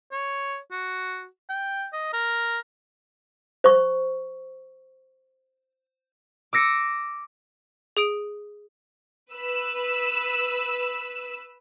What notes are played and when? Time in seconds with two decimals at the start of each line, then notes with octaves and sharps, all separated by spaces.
0.12 C#5
0.72 F#4
1.50 G5
1.93 D#5
2.13 A#4
3.64 C5 C#6
6.53 D6 E6 A#6 C#7
7.97 G#4 D#6 D7
9.32 B4 E6